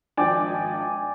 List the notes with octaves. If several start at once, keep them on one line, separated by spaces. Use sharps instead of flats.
G#1 F3 D4 D5 G5 G#5